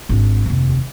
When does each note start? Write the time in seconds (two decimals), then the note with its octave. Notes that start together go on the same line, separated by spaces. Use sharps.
0.09 G#1 D4
0.46 F1 D#2